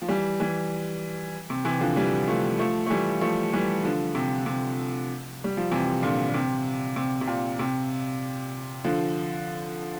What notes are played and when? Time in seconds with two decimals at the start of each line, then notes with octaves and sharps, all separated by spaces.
0.02 F3
0.09 E3 G3
0.40 E3 G3
1.50 C3
1.65 C3 E3
1.80 D3 F3
1.96 E3 G3
2.27 F3 A3
2.59 F3 A3
2.86 A3
2.90 E3 G3
3.21 F3 A3
3.53 E3 G3
3.84 D3 F3
4.15 C3
4.46 C3
5.44 G3
5.57 F3
5.71 C3 E3
6.02 A#2 D3
6.29 D3
6.34 C3
6.96 C3
7.21 C3
7.27 A#2
7.59 C3
8.84 D3 F3